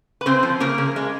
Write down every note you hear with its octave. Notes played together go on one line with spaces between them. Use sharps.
B4
C#3 C4 C5
F3
C#3 A#3 A#4
C#3
G#3